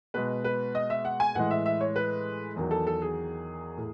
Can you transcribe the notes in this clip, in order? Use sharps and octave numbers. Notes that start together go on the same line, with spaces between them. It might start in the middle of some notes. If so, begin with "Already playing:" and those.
B2 G#3 B4
B4
D#5
E5
F#5
G#5
A2 E3 G#3 F#5
E5
E5
C#5
B4
E2 D#3 F#3
A4
A4
G#4
A2